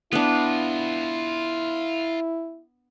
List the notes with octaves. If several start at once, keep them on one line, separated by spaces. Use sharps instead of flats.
B3 D4 E4 F4 B4